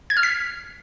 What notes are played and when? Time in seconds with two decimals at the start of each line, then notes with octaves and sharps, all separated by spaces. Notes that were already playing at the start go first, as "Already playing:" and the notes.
0.10 G#6
0.17 F6
0.23 B6